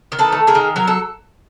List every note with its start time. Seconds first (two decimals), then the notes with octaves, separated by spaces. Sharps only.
0.12 D#3
0.19 A4 B4
0.32 A3
0.47 G#4 A#4
0.55 D#3
0.76 F#3 A#4
0.88 A4